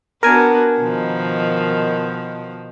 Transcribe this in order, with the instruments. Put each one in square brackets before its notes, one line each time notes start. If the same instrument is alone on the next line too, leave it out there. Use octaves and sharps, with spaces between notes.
[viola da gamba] B3 D4 F#4 [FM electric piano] A#4 G#5
[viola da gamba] B2 D#3 F3